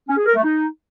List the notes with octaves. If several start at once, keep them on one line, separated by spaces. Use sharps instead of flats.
C#4
G#4
A#4
A3
D#4